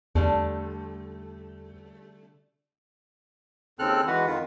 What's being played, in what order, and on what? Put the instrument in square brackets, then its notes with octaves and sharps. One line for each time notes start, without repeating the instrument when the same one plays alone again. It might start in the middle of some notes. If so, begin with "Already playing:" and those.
[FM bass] E2 [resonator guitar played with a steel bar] D3 G3 A3
[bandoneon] D#2 C#3 C4 A4 F6 F#6
E3 G#3 F#4 B4 F#5
F2 D#3 F4